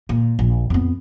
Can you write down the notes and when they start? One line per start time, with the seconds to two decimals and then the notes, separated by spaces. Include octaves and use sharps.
0.09 A#2
0.39 A#1
0.70 F2 B3